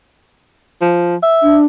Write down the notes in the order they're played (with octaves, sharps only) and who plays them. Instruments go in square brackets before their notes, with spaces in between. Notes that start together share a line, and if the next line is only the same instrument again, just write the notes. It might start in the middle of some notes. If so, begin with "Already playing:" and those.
[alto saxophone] F3
E5
[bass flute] D4